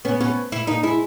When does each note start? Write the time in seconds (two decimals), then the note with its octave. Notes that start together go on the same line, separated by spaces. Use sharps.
0.05 B3 C#4
0.21 B3 C#4
0.52 E4
0.67 A#3 D#4
0.83 G#3 E4